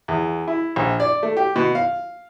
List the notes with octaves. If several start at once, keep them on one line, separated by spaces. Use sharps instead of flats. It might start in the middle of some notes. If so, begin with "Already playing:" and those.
E2
E4
A#1
D5
A3
G4
B2
F5